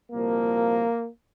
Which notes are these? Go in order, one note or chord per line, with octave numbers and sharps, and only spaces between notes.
C2 A#2 F3 A#3